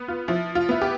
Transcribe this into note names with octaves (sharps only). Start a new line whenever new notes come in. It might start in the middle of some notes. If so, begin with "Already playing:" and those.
Already playing: B3
F4
F3 E4
F4
B3 E4
G4